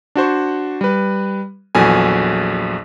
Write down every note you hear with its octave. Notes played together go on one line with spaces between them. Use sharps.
D4 F#4 C5 C#6
G3 B4
A#1 E2 F#3 A4 G#5